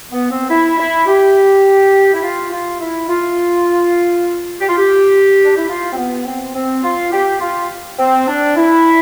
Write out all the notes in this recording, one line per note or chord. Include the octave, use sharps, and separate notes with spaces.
B3
C4
E4
E4
G4
E4
F4
F4
E4
F4
G4
F4
G4
D4
E4
F4
C4
B3
C4
C4
F4
G4
F4
C4
D4
E4